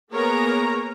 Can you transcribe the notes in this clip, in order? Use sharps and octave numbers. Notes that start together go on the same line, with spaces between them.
A#3 B3 G#4 A#4 C#5 A#5